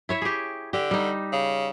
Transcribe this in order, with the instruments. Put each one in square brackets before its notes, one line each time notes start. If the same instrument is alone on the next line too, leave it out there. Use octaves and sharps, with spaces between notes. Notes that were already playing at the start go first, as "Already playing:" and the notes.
[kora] E4 C#5 E5
G4 G#4
[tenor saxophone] D3 [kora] G4
[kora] G3 D#4
[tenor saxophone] C#3